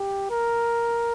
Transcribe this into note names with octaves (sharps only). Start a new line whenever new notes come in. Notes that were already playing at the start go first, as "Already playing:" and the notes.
Already playing: G4
A#4